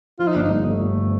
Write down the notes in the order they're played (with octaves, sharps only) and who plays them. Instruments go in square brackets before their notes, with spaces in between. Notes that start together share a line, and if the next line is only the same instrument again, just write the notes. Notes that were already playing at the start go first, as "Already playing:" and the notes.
[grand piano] F3 [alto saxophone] F4
[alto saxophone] D#4
[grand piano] G1 [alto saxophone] D4
[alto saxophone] D#4
[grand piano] G2
[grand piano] G1 [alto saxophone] A3
[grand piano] G1